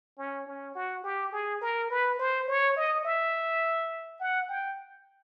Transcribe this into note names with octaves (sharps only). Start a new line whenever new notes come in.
C#4
C#4
F#4
G4
G#4
A#4
B4
C5
C#5
D#5
E5
F#5
G5